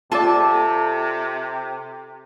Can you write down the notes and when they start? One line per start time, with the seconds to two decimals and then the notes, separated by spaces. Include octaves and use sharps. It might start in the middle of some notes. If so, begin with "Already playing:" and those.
0.12 C3 F4 A4 D5 A5